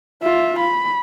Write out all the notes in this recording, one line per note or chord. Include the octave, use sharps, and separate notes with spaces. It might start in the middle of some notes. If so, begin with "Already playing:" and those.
F4 E5
B5